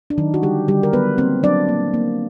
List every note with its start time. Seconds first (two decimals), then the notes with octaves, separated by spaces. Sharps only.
0.10 D4
0.18 D#3 F#3 D#4
0.34 F#4
0.43 D3 G3 G4
0.68 D3 G3 G4
0.83 A#4
0.93 F#3 B3 B4
1.18 A#3 C4 C5
1.43 F#3 D4 D5
1.69 A#3
1.94 A#3